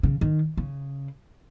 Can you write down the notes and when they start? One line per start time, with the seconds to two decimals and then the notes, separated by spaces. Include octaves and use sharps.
0.03 C#3
0.21 D#3
0.57 C#3